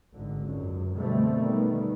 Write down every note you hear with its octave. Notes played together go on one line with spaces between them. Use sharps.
G#1 D3
C#2 F#2
B2 D3 G3 A3 C4
D#3 G3 B3